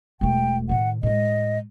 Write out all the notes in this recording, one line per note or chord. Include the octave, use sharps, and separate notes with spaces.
E1 A3 G5
A2 D#3 F#5
A2 G#3 D#5